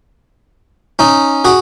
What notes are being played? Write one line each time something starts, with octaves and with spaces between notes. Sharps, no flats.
C#4 D#4
F#4 G#4